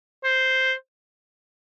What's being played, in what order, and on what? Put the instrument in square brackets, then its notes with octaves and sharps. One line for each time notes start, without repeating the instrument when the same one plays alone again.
[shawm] C5